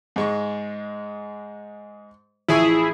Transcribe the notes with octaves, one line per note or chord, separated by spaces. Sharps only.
G#2 G#3 C#6
A1 F3 E4 G#4 C#6